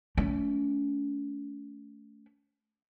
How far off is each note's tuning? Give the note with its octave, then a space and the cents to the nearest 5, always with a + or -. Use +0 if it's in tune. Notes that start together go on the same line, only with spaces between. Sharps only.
A3 -10 C#4 +35